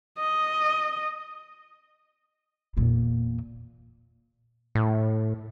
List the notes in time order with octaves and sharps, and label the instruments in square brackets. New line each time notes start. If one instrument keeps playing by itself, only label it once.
[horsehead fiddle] D#5
[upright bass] E2 A#2
[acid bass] A2